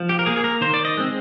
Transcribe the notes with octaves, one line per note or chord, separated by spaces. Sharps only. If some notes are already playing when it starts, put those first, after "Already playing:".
Already playing: F3
G4
A#4
A#3 G#4
G#4
A#4
D#3 C5
D5
D#5
G#3 C4